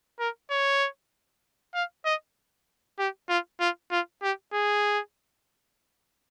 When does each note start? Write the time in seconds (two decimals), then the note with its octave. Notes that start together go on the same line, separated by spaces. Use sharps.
0.19 A#4
0.50 C#5
1.74 F5
2.05 D#5
2.99 G4
3.29 F4
3.60 F4
3.91 F4
4.22 G4
4.53 G#4